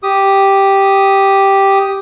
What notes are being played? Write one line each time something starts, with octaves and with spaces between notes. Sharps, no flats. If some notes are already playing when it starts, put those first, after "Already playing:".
G4 D#6